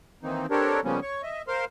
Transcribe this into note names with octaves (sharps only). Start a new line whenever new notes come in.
D#3 E3 A#3 C4 D#4
C4 D4 G4 A4 A#4 C#5
C#3 F3 G3 A#3 B3 C#4
C#5 C#6
D#5 E5
A#4 C5 F5 C6